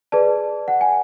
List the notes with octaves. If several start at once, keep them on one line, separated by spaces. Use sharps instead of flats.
G#4 B4 D5 A5
F#5
G#5